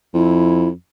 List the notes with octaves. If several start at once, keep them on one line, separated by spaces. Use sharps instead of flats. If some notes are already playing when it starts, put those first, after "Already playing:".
F2 E4